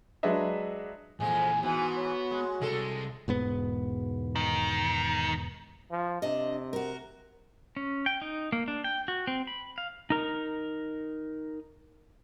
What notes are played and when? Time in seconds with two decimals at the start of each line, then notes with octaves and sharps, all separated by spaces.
0.23 F#3 G#3 D4 B4 D#5 E5
1.20 F2 A#2 E3 G#3 G#5
1.63 G#2 E3 B3 F#4 G#5
1.96 C#5
2.31 G#3
2.61 C2 C3 G#3 A4
3.28 E1 G#2 B3
4.36 D#3
5.91 F3
6.22 C3 D4 D#5
6.73 F#4 A#4
7.77 C#4
8.06 G5
8.22 D#4
8.52 A#3
8.68 D4
8.84 G5
9.08 F#4
9.27 C4
9.47 B5
9.78 F5
10.10 D#4 A#4